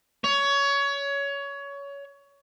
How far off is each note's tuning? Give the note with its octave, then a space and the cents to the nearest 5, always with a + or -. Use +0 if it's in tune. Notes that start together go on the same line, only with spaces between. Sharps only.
C#5 +20